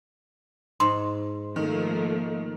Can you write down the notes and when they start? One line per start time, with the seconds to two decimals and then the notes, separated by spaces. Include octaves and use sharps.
0.80 G#2 C6
1.56 D#3 F3 A3 A#3